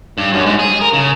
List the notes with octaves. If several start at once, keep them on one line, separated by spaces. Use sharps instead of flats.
G2
F#2
G#2
G#4
A#4
C#3